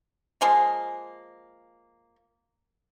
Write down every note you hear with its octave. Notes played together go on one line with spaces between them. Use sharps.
F3 G#3 A#3